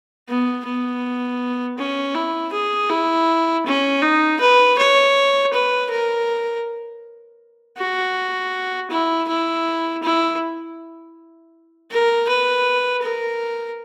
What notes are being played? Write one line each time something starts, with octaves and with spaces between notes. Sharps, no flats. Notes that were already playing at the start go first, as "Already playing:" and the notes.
B3
B3
C#4
E4
G#4
E4
C#4
D#4
B4
C#5
B4
A#4
F#4
E4
E4
E4
A#4
B4
A#4